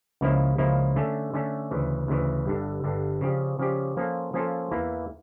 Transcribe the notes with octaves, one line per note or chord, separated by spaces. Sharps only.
C#2 C#3 F3 A#3 E4
C#2 C#3 F3 A#3 E4
D3 A3 C#4
D3 A3 C#4
D2 C#3 E3
D2 C#3 E3
G1 G2 D3
G1 G2 D3
C#3 F3 C#4 G4 D5
C#3 F3 C#4 G4 D5
F3 A#3 C#4 F4 A4
F3 A#3 C#4 F4 A4
E2 E3 A#3 E4